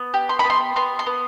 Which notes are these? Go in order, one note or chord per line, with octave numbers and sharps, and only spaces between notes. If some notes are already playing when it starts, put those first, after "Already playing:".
Already playing: B3
G4
C6
B3 B5
C6
B3 C6
C6
B3